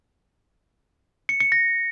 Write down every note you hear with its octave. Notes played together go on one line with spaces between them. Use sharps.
C#7
C#7
A#6